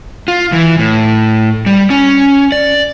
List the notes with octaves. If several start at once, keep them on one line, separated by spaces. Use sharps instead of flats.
F4
E3
A2
G3
C#4
D5